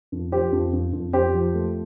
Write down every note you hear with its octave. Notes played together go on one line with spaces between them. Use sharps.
F2
F3 G4 C5
F2
F2
F2
F2 G4 C5
F3
A3